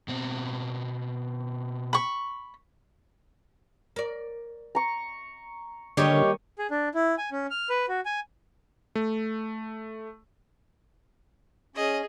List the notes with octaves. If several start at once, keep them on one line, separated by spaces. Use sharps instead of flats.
B2 C4
B5 C#6
A#4 D5
A#5 C#6
D3 D#3 G3 A#3 G4 C#5 D#5
G#4
D4
E4
G#5
C#4
F6
B4
F#4
G#5
A3
C#4 G#4 D#5